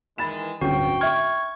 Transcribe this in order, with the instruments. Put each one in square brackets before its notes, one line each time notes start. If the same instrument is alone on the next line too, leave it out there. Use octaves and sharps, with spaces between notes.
[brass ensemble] D#3 E3 G#3 [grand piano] B5 A6 E7
[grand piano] D1 G1 C#4 [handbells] F#4 [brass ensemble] G5
[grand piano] E5 F6 [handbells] C#6 G#6